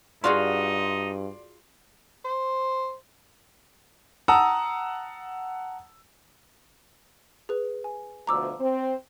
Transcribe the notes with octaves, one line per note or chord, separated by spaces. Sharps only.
G2 D#4 F4 F#4 G#4 D5 C6
C5
F#5 A5 A#5 D#6 E6
G#4 B4
G#5
D2 B2 F3 A#5 D6 E6
C4 C5